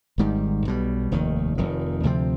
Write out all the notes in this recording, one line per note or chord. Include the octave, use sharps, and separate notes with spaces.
G#1 G#2 D#3 G3
B1 B2 G3
F1 D#2 D#3
F1 F2 D#3
D2 C3 F3 C4